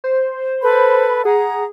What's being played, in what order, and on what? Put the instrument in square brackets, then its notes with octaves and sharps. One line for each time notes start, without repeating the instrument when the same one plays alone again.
[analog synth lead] C5
[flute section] A4 B4 B5
[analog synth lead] G#4 [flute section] F#5 A#5